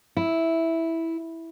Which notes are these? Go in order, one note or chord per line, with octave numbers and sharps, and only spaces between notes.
E4